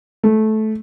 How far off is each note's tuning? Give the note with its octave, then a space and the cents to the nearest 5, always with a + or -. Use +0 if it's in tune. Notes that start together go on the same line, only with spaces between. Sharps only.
A3 -15